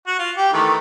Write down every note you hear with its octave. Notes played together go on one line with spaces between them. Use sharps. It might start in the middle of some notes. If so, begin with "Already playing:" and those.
F#4
F4
G4
D#3 E3 A3